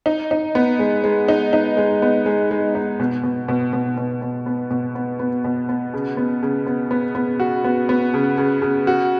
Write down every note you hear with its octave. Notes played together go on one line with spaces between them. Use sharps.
D#4
D#4
B3
G#3
G#3
D#4
D#4
G#3
B3
G#3
G#3
D#4
B2
B2
B2
B2
B2
B2
B3
B2
B3
B3
B2
B3
C#3
B3
C#3
B3
B3
B3
F#4
B3
B3
C#3
C#3
C#3
F#4